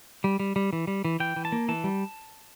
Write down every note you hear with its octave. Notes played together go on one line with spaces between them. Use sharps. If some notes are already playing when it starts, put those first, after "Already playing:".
G3
G3
G3
E3
G3
E3
E3 G5
E3
A5
A#3
E3 A5
G3